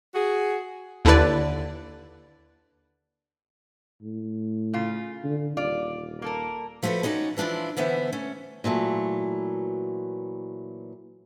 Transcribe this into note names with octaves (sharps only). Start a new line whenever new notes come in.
F#4 G#4
D#2 D3 D4 E4 B4 D5
A2
C#3 F4
D3
D#1 F4 D5
A#3 A4 A#4
F3 A3 F#4 G#4 A4 B4
C#4 D#4 F#4 B4 D5
E3 F3 D4 E4 F4
D3 E3 B3 C5 E5
A3 C#4
A#2 E3 F#3 A3